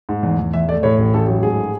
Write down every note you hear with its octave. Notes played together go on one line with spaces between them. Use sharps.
G#2
E2
E2
E2 E5
A3 D5
A2 C#5
A1
A1 A4
F#3
G#2 G#4